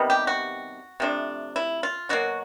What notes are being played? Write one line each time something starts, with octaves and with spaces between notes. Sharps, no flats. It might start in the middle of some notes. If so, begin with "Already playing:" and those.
Already playing: C3 D#3 G3 B3
G4
F#4
C3 F3 A3 D4
E4
F4
B2 F#3 A#3 F#4